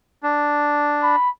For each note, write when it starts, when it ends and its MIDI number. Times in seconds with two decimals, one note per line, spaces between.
0.23 1.16 62
1.03 1.30 83